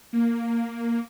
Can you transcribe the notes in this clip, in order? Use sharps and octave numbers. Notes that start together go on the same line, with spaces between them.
A#3